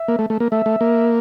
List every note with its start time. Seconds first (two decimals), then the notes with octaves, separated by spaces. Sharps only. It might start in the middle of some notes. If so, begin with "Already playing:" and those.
Already playing: E5
0.08 A#3
0.19 A3
0.30 A3
0.40 A#3
0.52 A3 E5
0.66 A3
0.81 A#3